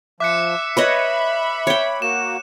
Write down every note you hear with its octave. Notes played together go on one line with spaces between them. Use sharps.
F3 E5 D6 F#6 C#7
B4 C#5 D#5 B5
C#5 G5
A#3 F#4 E7